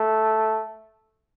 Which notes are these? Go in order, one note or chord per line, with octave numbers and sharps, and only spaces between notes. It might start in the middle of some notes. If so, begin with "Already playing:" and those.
Already playing: A3